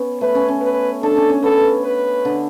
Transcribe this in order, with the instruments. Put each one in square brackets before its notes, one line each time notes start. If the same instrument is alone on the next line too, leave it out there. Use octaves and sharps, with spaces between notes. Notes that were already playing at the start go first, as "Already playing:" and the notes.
Already playing: [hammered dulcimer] B3 C#4
[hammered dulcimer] A3 [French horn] B4
[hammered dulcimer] C#4
C#4
[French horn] B4
[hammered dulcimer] D4 [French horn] A4
[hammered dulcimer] C#4
C#4
[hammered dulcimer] B3 [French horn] A4
[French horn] B4
[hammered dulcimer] D3